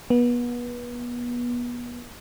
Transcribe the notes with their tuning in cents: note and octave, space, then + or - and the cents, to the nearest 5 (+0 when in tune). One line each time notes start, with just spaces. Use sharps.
B3 -30